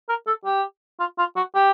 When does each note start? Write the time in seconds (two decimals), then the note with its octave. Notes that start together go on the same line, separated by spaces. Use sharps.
0.09 A#4
0.27 A4
0.45 G4
0.99 F4
1.18 F4
1.36 F#4
1.55 G4